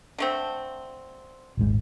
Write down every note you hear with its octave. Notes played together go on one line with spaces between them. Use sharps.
D3 A3 C4
D#1 G#1 G#2